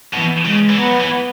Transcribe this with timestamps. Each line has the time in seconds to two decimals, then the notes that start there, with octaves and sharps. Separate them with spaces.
0.13 B2 E3
0.45 C#3 G#3
0.70 E3
0.78 F#3 B3
1.00 E3